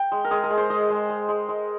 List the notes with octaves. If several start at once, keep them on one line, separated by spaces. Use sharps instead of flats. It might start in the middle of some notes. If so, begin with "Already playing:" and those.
Already playing: G5
G#3
A#4
G#3 G#4
A#4
G#3
C5
G#3 D#5
G#3
G#3
G#3
G#3